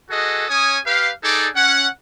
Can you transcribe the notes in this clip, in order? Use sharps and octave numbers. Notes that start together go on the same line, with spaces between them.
F#4 G#4 A4 B4 D#5
C#4 C#5 G#5 D#6
G4 B4 F5
D#4 G#4 A4 D5
C#4 F#5